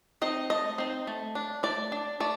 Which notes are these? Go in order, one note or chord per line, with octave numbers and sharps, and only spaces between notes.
C4 D#4 D#5
A3 D#5
C4 D#4
A3
D4
A3 D5
D4
A3 D5